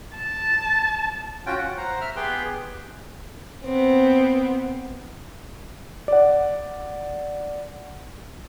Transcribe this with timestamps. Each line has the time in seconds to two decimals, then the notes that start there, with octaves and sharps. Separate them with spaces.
0.17 A5
1.46 C#4 F4 F#4 G5
1.58 F#5
1.77 C5 F#5 A#5
2.01 E5 F6
2.16 B3 G4 G#4 B4 G5 C6
3.64 B3 C4
6.08 D5 F#5